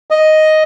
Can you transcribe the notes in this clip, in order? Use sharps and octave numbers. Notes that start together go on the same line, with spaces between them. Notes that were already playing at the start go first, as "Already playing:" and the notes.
D#5